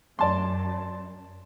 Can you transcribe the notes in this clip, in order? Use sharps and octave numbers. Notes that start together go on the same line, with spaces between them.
F#2 D5 A5 C6